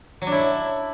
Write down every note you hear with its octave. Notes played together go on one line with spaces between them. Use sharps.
F#3
D4
E4